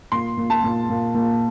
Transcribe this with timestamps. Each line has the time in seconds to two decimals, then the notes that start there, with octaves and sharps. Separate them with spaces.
0.12 A#2 C6
0.37 A#2
0.50 A5
0.64 A#2
0.90 A#2
1.14 A#2